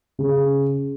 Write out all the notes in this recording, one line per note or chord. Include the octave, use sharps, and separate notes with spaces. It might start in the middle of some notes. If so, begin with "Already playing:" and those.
C#3